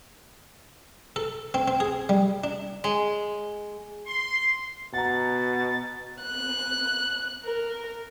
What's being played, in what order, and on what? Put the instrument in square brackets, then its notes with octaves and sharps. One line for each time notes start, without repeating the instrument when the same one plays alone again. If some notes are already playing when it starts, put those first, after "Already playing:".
[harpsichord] A4
C4
C4
G#4
G3
D4
[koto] G#3
[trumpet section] C6
[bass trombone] B2 [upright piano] F#5 A#5 [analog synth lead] A6
[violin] F#6
A#4